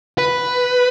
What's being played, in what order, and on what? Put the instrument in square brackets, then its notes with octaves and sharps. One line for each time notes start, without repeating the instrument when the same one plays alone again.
[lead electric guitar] B4